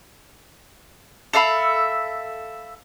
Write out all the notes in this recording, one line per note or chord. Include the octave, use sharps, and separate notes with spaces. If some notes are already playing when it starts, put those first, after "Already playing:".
A4 E5 F5 B5